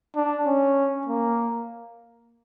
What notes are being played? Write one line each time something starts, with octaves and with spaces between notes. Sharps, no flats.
D4
C#4
A#3